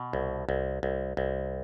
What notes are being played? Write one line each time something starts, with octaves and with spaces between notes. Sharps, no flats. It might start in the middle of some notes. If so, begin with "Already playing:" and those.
Already playing: B2
C2
C2
C2
C2